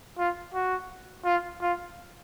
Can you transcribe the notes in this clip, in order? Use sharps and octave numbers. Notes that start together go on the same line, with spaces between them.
F4
F#4
F4
F4